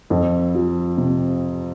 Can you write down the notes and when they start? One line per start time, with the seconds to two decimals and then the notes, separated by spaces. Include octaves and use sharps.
0.10 F2
0.55 F3
0.98 C3